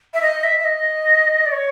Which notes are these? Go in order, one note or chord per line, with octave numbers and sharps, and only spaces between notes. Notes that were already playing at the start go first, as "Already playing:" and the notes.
E5
D#5
E5
E5
D#5
D5
C#5